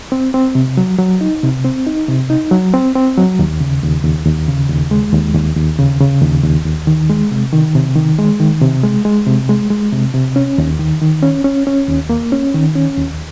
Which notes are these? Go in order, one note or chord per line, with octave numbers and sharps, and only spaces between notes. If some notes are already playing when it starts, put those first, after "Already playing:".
C4
C4
C3
F#3
F#3
D#4
C3
C4
D#4
C3
D#4
F#3
C4
C4
F#3
D#2
C#3
D#2
D#2
D#2
C#3
D#2
G#3
D#2
D#2
D#2
C#3
C#3
D#2
D#2
D#2
D#3
G#3
C3
D#3
C3
D#3
G#3
D#3
C3
G#3
G#3
C3
G#3
G#3
C3
C3
C#4
D#2
D#3
D#3
C#4
C#4
C#4
D#2
A#3
C#4
D#3
C#4
D#2